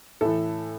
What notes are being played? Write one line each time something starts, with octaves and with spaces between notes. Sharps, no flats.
A2 E3 A4